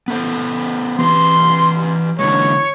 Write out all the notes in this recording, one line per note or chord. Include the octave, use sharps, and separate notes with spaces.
B3 A4 C5
E3 G4 B4 C6
D3 E3 G#3 C#5